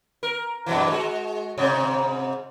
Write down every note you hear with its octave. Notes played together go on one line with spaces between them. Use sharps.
A#4
F#2 B2 E3
G#3 F#4
G#2 C3